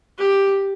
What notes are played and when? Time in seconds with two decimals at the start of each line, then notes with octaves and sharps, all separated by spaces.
0.19 G4